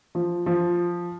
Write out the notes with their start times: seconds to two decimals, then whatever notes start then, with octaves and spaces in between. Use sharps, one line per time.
0.15 F3
0.46 F3